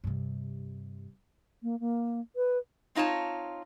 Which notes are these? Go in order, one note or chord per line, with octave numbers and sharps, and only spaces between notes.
G2 C3
A#3
A#3
B4
C4 D#4 F4 C#5 A5